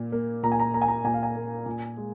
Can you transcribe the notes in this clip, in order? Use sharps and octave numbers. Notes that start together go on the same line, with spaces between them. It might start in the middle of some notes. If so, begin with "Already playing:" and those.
Already playing: A#2 A#3
A#3
A#2 A#5
G#5
A#5
A#3 A#5
G#5
A#5
A#2 G#5
F5
G#5
A#3
A#2
G#3